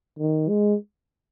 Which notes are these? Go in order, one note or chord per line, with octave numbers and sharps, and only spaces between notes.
D#3
G#3